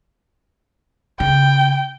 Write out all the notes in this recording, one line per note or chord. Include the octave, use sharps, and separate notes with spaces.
C#3 G5